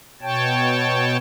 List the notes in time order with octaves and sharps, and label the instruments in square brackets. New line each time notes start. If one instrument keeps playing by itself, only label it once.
[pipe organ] B2 C#5 G5 A5